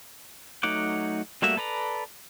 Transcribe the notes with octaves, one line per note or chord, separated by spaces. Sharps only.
F#3 A3 D#4 F#5 D6
G3 A3 A#3 F#4 E5
A4 B4 D5 A#5